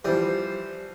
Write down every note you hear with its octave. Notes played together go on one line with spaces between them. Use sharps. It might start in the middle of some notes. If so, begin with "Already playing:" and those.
E3 F3 G3 C5